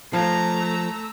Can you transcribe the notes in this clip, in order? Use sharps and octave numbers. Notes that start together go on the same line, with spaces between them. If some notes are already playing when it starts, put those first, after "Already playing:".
F3 A3 A5 A#5 G#6 A#6
E6